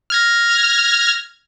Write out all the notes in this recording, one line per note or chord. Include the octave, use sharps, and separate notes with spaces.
F6 G#6 A#6